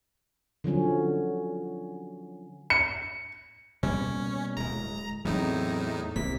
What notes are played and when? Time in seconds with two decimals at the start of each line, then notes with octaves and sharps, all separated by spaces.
0.64 D3 F3 F#3 C#4
2.70 C#7
3.83 B2 G3 A#3 C#4
4.57 D1 G#3 A#5
5.25 E2 A2 F#3 C4 D#4
6.16 C2 C3 A#3 B6